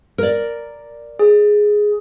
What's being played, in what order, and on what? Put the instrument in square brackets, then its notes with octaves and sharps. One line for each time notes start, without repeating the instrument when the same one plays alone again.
[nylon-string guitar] A#4 D5
[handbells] G#4